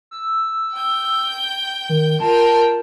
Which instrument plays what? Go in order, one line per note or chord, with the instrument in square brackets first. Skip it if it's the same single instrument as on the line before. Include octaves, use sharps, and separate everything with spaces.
[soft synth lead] E6
[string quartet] G5 G6
[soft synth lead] D#3
[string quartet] F4 A#4 G5 [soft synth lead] A5